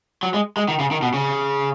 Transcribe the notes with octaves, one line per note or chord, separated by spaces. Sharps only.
F#3
G#3
G#3
D#3
C#3
D#3
B2
C#3